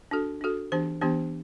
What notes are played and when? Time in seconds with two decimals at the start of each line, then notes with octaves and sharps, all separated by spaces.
0.11 D4 F#4 A4
0.41 D4 F#4 A4
0.72 E3 B3 D4 G4 C5
1.01 E3 B3 D4 G4 C5